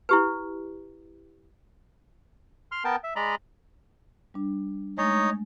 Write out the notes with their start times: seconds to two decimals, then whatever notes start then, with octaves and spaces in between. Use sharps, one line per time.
0.09 E4 G4 B4
2.72 C6 F6
2.85 B3 A#4 G5 A5
3.04 E5
3.16 G#3 D5 D#5 A#5 B5
4.34 G3 D4
4.98 G#3 A3 D#4 C#5 D#5 A6